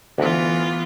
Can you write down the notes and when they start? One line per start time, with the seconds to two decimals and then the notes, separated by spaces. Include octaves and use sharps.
0.18 D2 E3 B3 F4